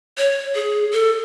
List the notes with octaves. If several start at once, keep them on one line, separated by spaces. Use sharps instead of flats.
C#5
G#4
A4